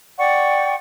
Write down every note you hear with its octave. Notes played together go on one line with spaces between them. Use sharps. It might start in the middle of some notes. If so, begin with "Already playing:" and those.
D5 F#5 G5 C#6